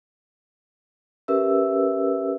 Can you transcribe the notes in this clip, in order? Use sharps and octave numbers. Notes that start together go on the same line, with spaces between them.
C#4 G4 A#4 B4 E5 E6